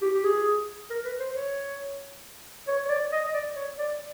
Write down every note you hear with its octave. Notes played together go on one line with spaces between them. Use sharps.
G4
G4
G#4
A#4
B4
C5
C#5
C#5
C#5
D5
D#5
D5
C#5
D5